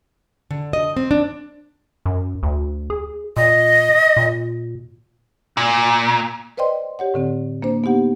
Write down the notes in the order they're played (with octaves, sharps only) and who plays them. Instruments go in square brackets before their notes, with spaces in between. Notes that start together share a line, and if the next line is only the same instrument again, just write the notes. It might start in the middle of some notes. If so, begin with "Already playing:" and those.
[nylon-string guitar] D3
D#5
C4
D4
[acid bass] F#2
D2
G#4
[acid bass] A#2 [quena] D#5
[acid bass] A#2
[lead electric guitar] A#2
[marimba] B4 C5 D5 D#5 G5 C6
G4 C#5 F#5
A2 D3 C4
A#3 D4 C5
B3 D#4 G4 F#5